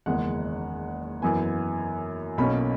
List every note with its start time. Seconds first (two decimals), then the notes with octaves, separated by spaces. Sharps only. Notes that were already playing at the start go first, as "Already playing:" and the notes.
0.06 F#1 E2 D#3 G#3 F#5
1.22 F#2 E3 B3 G#5
2.38 B1 B2 A#3 C#4 B5